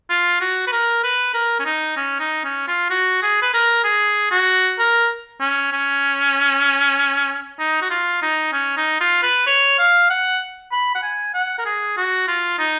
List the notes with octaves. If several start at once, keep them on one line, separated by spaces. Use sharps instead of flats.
F4
F#4
B4
A#4
B4
A#4
C#4
D#4
C#4
D#4
C#4
F4
F#4
G#4
B4
A#4
G#4
F#4
A#4
C#4
C#4
D#4
F#4
F4
D#4
C#4
D#4
F4
B4
C#5
F5
F#5
B5
F#5
G#5
F#5
A#4
G#4
F#4
F4
D#4